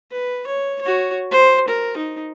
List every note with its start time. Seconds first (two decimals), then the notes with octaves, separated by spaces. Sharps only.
0.11 B4
0.47 C#5
0.81 F#4 C#5
1.31 C5
1.68 A#4
1.97 D#4